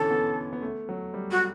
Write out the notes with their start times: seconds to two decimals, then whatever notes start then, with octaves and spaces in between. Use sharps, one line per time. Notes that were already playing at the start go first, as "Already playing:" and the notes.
Already playing: B2 D3 E3 C#4 A4
0.11 B3
0.53 B3
0.62 A3
0.89 F#3
1.14 G3
1.31 F#4